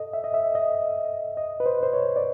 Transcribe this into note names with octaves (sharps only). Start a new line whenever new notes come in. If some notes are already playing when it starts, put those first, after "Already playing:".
Already playing: A4 D#5
E5
D#5
E5
D#5
D#5
B4
C5
C5
C#5
D5